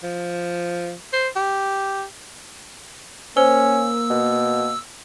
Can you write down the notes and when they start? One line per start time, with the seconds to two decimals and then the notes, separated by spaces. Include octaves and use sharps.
0.03 F3
1.13 C5
1.36 G4
3.37 A#3 C#4 C5 E6
4.10 B2